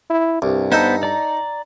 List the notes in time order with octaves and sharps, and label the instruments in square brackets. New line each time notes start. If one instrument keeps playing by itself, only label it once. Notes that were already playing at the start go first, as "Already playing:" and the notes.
[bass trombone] E4
[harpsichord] C2 [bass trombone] G2
[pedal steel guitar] B3 C5 G6 [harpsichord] D#4 A4
[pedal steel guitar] D5 A#5